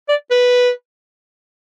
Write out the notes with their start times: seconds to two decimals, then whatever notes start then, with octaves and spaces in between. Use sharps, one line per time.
0.08 D5
0.30 B4